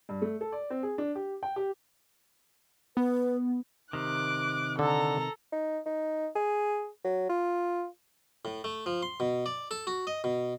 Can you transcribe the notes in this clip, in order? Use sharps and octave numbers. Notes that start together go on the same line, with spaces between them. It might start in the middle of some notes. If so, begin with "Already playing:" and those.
G2
A3
A4
D5
C4
G#4
D4
G4
G5
G4
B3 B4
C3 D#3 D6 F#6
D3 A4 A#5
D#4
D#4
G#4
F#3
F4
A2
A3
F3
C6
B2
D5
A4
F#4
D#5
B2